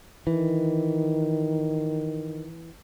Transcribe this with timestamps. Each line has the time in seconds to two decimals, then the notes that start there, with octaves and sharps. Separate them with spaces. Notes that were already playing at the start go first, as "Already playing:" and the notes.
0.27 D#3 E3